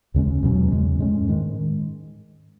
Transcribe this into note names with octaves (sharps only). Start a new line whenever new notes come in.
D#2 C#3 G#3 C#4
E2 B2 F#3 C#4
E2 C#3 G#3
A2 G#3 C#4
G#2 D#3 G#3